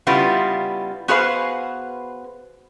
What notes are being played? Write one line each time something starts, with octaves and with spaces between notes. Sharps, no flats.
C#3 G3 B3 E4 F4
B3 F#4 G#4 B4 C5 F5